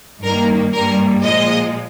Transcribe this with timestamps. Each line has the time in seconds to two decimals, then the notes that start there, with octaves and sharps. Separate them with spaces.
0.24 G2 D#3 A#3 A#4
0.74 G2 G3 A#3 A#4
1.24 A#2 F3 G#3 D#5